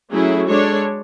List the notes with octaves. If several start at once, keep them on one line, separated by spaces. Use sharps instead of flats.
F#3 A3 C#4 E4 G#4
G#3 D4 A4 C#5